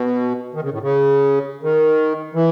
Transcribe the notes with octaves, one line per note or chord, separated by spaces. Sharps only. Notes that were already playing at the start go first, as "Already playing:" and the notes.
Already playing: B2
D#3
C#3
A2
C#3
D#3
E3